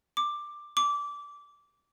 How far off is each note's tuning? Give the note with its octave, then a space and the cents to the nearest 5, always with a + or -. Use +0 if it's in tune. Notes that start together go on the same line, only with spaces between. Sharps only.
D6 +10
D6 -20